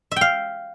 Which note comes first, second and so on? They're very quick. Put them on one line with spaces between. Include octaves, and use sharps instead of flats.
E5 G5 F5